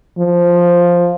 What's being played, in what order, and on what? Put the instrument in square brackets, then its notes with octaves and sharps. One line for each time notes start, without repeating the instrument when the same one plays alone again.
[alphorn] F3